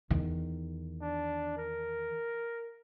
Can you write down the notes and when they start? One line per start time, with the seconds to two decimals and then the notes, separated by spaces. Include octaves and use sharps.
0.11 E2 D#3
1.02 D4
1.57 A#4